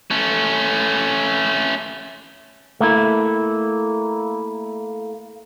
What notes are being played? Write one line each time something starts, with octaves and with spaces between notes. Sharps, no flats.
A3 C#4
A3 A#3 E4